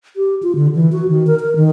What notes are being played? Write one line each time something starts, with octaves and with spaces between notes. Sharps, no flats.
G4
F4
D3
E3
F#4
D#3
A#4
A#4
D#3